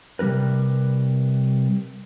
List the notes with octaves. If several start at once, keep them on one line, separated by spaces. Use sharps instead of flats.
C3 G3 B3 A#4 B4